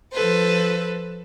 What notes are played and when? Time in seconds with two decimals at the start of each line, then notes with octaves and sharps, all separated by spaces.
0.13 F3 A4 B4 C5